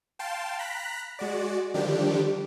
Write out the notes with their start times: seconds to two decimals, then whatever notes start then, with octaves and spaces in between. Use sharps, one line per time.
0.19 F5 G5 A5 C6
0.59 A#5 B5 F#6 B6
1.19 G#3 F#4 D5
1.74 D3 D#3 F3 G3 D4 G4